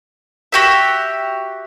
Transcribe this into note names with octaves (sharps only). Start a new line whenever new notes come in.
F#4 G4 E5